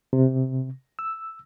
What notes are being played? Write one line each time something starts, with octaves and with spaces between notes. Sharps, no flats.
C3
E6